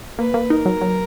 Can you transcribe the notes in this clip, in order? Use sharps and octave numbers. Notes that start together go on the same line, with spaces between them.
A#3 B4
A#3
D#4 A#4
F#3
F#3